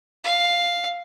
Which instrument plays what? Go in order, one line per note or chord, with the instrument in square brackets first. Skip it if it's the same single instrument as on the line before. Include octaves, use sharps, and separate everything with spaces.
[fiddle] F5